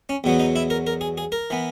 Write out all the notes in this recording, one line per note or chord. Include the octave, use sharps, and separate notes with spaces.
C#4
E2 B2 F#3 B3
D#4
E4
A#4
A#4
G#4
G#4
A#4
E3 B3